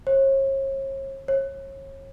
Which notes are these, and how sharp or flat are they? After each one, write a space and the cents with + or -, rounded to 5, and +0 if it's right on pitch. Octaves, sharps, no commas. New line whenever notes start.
C#5 -40
C#5 -30